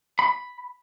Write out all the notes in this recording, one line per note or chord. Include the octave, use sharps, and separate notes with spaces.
B5